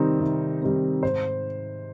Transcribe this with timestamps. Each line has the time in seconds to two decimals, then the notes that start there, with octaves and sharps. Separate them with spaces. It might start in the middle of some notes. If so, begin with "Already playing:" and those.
Already playing: C3 D#3 G3 C4 D#4
0.20 C3
0.62 D#3 G3 C4 D#4
1.03 G#2 C5